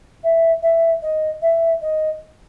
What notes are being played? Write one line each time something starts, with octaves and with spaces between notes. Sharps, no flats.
E5
E5
D#5
E5
D#5